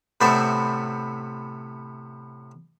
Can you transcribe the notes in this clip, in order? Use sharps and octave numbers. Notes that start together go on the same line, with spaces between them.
A2 C3 B3 C5 D5 E5